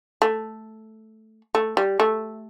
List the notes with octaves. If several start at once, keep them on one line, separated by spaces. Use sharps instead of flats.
A3
A3
G3
A3